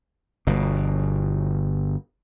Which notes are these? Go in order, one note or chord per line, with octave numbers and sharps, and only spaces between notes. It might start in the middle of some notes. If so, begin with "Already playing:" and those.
G1 B2